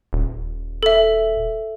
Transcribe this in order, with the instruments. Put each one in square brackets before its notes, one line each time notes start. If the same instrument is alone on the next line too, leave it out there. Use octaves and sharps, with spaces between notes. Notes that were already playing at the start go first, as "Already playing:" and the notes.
[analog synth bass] D#1
[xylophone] A4 E5